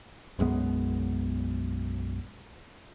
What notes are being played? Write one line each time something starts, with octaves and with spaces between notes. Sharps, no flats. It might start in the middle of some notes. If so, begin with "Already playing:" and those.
B1 F#2 G#3 B3